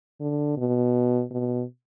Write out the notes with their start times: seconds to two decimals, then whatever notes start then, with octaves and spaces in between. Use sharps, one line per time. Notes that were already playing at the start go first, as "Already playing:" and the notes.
0.21 D3
0.57 B2
1.31 B2